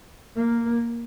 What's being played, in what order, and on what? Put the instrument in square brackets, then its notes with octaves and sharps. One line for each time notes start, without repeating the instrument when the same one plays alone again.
[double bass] A#3